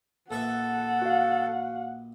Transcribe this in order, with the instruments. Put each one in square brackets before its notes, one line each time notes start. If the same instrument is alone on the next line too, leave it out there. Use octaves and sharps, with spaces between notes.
[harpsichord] A#1 B4 E5 [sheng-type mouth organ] A4 [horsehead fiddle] F#5
[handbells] F#4 F5